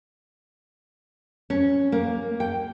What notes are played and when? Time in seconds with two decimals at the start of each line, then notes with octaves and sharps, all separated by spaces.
1.50 C#4
1.92 A#3
2.40 G5